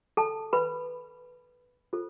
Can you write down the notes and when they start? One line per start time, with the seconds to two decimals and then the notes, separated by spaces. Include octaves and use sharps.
0.17 A4 A5
0.53 B4 B5
1.93 F4 A4 C5